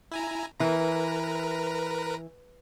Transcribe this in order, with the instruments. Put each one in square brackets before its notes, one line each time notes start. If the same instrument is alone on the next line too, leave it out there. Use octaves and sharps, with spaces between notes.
[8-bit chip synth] E4 G#5 A#5
[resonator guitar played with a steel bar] E3 [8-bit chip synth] A#4 B4 A#5